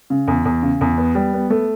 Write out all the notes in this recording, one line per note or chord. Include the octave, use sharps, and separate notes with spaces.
C#3
E2
E2
C#3
E2
B3
G3
B3
A3